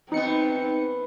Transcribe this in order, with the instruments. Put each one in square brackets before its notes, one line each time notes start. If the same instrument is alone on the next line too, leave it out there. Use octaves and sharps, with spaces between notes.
[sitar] F#2 B3 [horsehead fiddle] C4 [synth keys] D#4 C#7